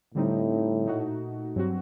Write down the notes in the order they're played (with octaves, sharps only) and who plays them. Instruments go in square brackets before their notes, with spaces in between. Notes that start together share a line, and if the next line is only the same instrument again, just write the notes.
[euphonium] A2 [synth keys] D3 G3 C4 D#4
[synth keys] A#2 A3 D#4 F#4
G2 F#3 C4 F#4